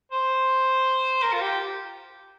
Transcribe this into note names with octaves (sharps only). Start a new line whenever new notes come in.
C5
A#4
F4
G4